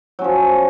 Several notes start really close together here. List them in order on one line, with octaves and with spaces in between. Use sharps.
F#3 C#4 F3